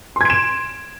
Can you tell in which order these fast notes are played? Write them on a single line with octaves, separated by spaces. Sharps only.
C6 G#6 D7 E7